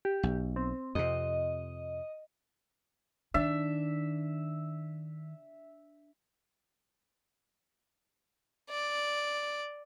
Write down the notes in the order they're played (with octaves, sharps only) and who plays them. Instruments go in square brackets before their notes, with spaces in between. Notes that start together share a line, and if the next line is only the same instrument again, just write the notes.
[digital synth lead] G4
[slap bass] B1
[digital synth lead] C4
[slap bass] F2 C3 [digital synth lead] D#5
[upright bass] D#3 [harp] D4 [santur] E5
[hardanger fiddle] D5